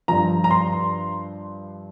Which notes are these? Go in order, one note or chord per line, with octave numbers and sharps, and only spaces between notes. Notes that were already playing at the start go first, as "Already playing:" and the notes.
G2 F3 A#5
A#5
C6